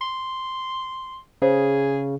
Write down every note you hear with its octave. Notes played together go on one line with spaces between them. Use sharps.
C6
C#3 G#4 C5